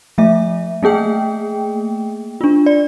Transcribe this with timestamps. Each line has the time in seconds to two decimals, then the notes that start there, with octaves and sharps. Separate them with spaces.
0.18 F3 A3 E5
0.83 A3 A#3 G#4 G5
2.41 D4 F4
2.66 D5